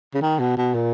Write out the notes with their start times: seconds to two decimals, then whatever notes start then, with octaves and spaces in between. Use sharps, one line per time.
0.14 C#3
0.21 D#3
0.40 B2
0.57 B2
0.75 A#2